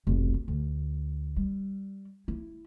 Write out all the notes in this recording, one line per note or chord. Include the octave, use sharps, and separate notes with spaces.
F1 B1
D2
G3
E4